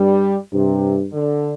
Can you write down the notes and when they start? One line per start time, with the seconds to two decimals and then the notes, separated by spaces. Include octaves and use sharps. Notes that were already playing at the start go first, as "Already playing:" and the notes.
Already playing: G2 G3
0.53 G2 C3
1.13 D3